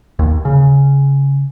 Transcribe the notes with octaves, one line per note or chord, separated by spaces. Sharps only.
D#2
C#3